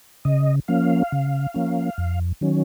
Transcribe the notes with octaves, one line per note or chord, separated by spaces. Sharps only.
C#3 D#5
F3 A#3 C#4 F5
C#3
F3 A#3 C#4
F2
D#3 F#3 C#4